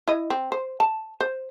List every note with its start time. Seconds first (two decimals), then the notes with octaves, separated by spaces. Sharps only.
0.08 E4 D#5
0.30 C4
0.52 C5
0.80 A5
1.20 C5